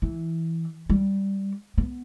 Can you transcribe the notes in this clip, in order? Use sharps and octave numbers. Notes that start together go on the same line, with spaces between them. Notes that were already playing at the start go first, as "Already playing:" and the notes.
E3
G3
B3